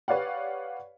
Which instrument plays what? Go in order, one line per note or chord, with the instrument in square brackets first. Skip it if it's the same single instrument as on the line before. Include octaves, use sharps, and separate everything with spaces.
[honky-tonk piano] G4 B4 C#5 D5 F5 F#5